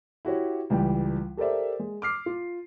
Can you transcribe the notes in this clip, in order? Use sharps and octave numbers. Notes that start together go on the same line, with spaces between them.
E4 F#4 G4 C#5
C#2 E3 G3 G5
G4 A4 A#4 C5 D5 E5
G#3
D6 F6 C7
F4